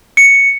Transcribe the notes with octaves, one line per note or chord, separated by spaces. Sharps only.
C#7